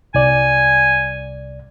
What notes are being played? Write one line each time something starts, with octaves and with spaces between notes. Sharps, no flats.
C2 D5 G#5